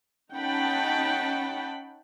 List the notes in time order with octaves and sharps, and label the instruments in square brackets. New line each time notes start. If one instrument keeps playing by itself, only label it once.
[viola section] C#4 D#4 F#5 G5 A5 B5